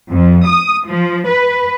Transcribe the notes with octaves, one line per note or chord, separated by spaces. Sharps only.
F2
D#6
F3
B4